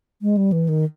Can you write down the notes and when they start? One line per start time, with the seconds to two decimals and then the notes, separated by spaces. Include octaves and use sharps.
0.22 G#3
0.37 G3
0.52 E3
0.69 D#3